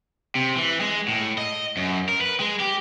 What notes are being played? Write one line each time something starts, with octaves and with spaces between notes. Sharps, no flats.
C3
E3
G#3
A2
D#5
F#2
A#4
B4
G#3
G4